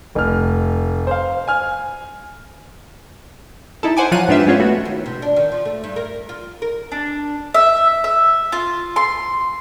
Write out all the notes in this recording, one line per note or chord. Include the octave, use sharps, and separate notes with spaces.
F1 F6
C5 F5
G#5 F6
D#4 E4 A4
C5 F#5 G#5 D6
F3 F#3 F4 C#5 F#6 D#7
G#2 B3 D4 F4 G4 E5
G#3 B3 C#4 F4 C5 C#5
A3 B3 F#4
D#2
C3
D4
D#3
F3
A3
G2
A#4
F4
A#4
D4
E5
E5
F4
C6